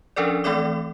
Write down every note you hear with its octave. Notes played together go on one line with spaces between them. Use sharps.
F3 C#4 D4 A4 A#4 D5
E3 A3 C4 A4 D5 D6